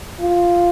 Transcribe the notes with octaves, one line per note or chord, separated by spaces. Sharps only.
F4